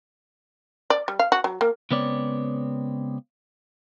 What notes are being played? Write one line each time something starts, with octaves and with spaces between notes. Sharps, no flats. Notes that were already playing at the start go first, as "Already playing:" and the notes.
D5
G3
F5
F#4
F#3
A#3
C#3 G#3 B3 C4 C#5 D5